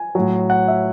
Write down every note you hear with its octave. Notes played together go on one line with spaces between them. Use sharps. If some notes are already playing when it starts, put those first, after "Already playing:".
Already playing: G#5
A2 F#3
F#5
E5